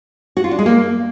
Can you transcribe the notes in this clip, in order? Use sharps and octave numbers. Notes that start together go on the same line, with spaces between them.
F#4
F4
D4
G#3
A#3